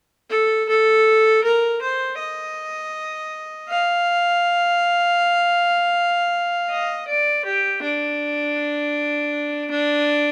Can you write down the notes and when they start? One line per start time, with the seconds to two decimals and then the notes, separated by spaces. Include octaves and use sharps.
0.30 A4
0.69 A4
1.44 A#4
1.81 C5
2.19 D#5
3.69 F5
6.70 D#5
7.08 D5
7.45 G4
7.82 D4
9.71 D4